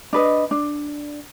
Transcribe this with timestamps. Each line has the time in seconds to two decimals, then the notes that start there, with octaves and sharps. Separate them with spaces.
0.13 D4 B4 D#5
0.51 D4